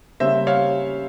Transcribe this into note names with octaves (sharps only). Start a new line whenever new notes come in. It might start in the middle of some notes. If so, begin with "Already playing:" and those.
C#3 G3 A#3 C#4 C5 E5
C#5 F5